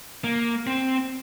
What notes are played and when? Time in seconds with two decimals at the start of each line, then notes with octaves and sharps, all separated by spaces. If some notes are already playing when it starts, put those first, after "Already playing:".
0.24 A#3
0.67 C4